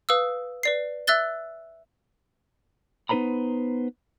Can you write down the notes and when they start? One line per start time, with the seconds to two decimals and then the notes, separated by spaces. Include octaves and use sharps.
0.09 B4 F5 D#6 E6
0.63 B4 D5 C7
1.07 E5 E6 F#6 A6 G7
3.09 B3 D#4 B4 C5 A#5 B5